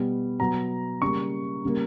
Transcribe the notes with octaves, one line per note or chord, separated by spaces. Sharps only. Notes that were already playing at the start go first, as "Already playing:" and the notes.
Already playing: B2 G3 B3
B2 F#3 B3 A#5
C#3 G3 A#3 C#6
C#3 G3 A#3